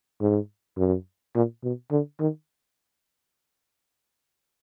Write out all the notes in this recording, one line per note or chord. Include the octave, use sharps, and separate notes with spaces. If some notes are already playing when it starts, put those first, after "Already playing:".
G#2
F#2
A#2
B2
D3
D#3